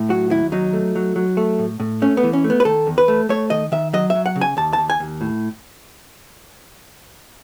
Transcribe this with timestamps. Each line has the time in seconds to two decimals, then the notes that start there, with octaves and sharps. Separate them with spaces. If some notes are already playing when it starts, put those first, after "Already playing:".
Already playing: A2
0.09 F#3 F#4
0.30 D#2 E4
0.52 F#3 D#4
0.73 A3
0.96 F#3
1.16 F#3
1.37 A3
1.59 A2
1.80 A2
2.02 A3 C#4
2.17 B3
2.23 E3
2.33 C#4
2.44 A3
2.50 B3
2.60 B4
2.65 D#3 A4
2.87 E2
2.98 B4
3.08 A3
3.29 A3 C#5
3.50 D#3 D#5
3.72 D#3 E5
3.93 F#3 D#5
4.10 E5
4.15 F#3
4.26 F#5
4.36 C#3
4.41 G#5
4.57 D#2 A5
4.73 D#2 A5
4.90 G#5
5.00 D#2
5.21 A2